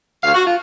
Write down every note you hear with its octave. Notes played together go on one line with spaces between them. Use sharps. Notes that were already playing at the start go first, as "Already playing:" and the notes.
D2 F5
F#4
F4